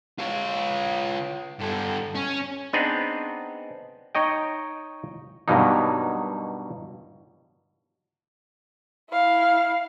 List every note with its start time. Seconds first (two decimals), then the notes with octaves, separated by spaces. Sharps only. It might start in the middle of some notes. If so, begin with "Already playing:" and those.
0.19 F4 C#5
1.60 G2 A4
2.15 C#4
2.73 B3 C4 D4 D#4 G#4 B4
4.15 D#4 C#5 D#5 G5
5.48 G2 B2 F#3 A#3 D#4
9.11 E4 F5